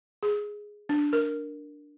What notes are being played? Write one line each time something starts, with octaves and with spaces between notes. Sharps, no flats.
G#4
D4
A#4